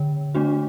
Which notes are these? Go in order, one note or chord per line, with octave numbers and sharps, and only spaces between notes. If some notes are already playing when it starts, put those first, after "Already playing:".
Already playing: D3
A3 D4 F#4